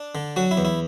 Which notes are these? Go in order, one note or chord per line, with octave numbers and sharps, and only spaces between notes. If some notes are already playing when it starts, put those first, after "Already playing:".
Already playing: D4
D3
F#3 F#4
E4
E2
E4